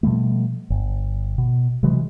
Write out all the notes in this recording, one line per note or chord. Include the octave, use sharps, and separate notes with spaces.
B2 F3 G3 A3
G1
B2
C3 E3 F#3 G#3